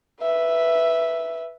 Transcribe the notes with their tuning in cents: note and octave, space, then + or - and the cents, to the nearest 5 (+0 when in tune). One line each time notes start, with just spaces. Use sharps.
B4 +0 E5 +0